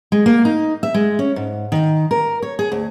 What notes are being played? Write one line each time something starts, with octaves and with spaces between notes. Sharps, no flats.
G#3
A#3
D#4
E5
G#3
C#4
G#2
D#3
A#4
C#5
G#4
D2